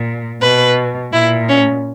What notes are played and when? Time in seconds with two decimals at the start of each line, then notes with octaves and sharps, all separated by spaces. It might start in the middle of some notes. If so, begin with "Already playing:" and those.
Already playing: A#2
0.41 B2 B4
1.12 A#2 E4
1.48 C#4